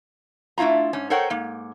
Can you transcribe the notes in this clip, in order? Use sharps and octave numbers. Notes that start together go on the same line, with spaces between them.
A3 D4 E4 F4 A#5
G#2 C#4
A4 A#4 C5 C#5 F#5 G5
G#2 A#3